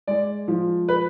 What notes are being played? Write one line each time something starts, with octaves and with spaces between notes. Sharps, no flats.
G#3 D5
F3
B4